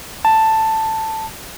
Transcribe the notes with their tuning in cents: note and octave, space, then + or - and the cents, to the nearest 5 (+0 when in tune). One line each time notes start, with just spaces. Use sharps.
A5 +10